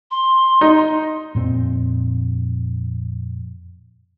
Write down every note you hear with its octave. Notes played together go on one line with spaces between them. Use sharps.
C6
D#4
F2 A#2 C4